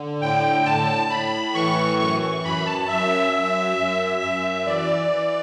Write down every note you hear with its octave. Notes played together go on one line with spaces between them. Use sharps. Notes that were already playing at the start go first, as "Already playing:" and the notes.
Already playing: D3
A2 G5
A2 A5
A2 B5
E3 C#6
F#2 C#6
C#6
F#2 B5
A5
F#2 E5
F#2
F#2
F#2
E3 D5
E3